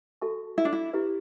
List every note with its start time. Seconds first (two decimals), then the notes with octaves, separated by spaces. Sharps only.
0.22 F#4 A4 E5 A5 C#6
0.58 E4
0.65 D4
0.73 E4
0.93 E4 G4 B4 E5